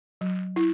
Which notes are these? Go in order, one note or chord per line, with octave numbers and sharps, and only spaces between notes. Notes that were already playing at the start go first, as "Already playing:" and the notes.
F#3
E4